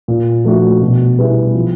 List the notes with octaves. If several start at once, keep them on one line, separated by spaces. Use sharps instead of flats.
A#2
F3 A3 D4 F#4
B2
G3 B3 E4 G#4
F3